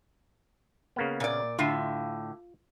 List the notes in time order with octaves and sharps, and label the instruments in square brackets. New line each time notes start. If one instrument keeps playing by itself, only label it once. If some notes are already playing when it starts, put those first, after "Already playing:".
[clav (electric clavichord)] C#3 A#3 B3
[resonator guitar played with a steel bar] A#2 D5
[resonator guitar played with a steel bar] A2 D3 [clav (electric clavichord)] F4